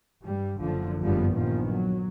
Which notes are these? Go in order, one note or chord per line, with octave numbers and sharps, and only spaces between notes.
G2 G3
F#1 D3 F3
F#1 G2 D3 F3 G3 B3
A#1 D#3 F3 B3
F#3